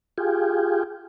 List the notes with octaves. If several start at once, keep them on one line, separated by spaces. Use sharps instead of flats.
F4 G4 G#4